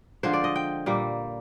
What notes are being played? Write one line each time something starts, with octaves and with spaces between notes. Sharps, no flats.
D3 F3 G#3 C5
D5
D#5
G5
A#2 G3 A#3